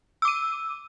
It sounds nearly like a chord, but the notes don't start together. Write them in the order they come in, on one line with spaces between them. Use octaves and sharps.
E6 D6 D#7